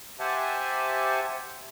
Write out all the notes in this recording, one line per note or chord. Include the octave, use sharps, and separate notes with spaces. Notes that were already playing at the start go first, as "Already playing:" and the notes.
G4 C5 E5 F#5 G#5 A5